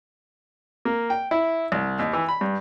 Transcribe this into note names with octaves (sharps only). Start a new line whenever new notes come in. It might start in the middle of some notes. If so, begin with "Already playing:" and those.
A#3
G5
E4
C2
D#2
E3
B5
G2